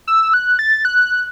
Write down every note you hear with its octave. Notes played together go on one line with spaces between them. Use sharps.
E6
F#6
A6
F#6